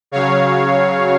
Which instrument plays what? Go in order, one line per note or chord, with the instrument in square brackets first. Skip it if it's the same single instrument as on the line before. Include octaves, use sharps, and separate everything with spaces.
[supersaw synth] C#3 F#3 C#5 F5